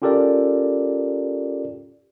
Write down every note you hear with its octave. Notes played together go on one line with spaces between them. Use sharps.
C#4 F4 G4 A4 A#4 D5